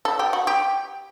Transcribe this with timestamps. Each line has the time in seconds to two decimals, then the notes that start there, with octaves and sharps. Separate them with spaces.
0.05 A4
0.19 G4
0.33 F#4
0.47 G4